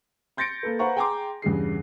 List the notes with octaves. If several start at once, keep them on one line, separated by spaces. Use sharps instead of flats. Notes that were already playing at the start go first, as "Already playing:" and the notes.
C6 G6 A6 A#6 C#7 D7
A#3 A4 B4
B4 C5 F5 F#5 A#5 C#6
G#4 G5 G#5 A#5 C6 D6
E2 G2 C#3 G#4 C7